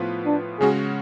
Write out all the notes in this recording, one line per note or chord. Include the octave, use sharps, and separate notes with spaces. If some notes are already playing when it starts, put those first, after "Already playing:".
Already playing: A2 F3 B3 F4 B4
D4
C#3 G#3 C#4 F#4 G#4